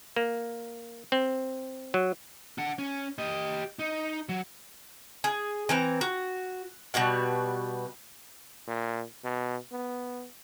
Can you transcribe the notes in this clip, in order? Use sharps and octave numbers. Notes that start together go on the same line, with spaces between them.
A#3
C4
F#3
D4 F#5
C#4
G4 D#5
D#4
F#3
G#4
E3 C4 A#5
F#4
B2 G3 F#4 F#5
A#2
B2
B3